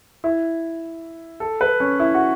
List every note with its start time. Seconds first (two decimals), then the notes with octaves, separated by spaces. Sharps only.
0.24 E4
1.40 A4
1.61 B4
1.80 C#4
2.00 E4
2.15 F#4